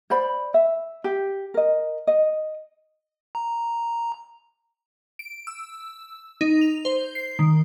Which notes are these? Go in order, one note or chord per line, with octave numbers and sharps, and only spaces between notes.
C5 D5 B5
E5
G4
A#4 D#5
D#5
A#5
D7
E6
D#4
F7
C5
C7
D#3